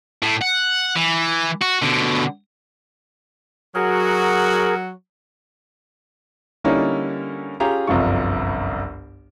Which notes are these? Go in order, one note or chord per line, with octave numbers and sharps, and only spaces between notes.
A2
F#5
E3
F#4
B2 D3
F#3 F#4 G#4 A#4
D3 G3 A#3 C#4 D#4 E4
C#4 F4 G4 G#4 A#5
G1 C2 F#2 F3 F4 C#6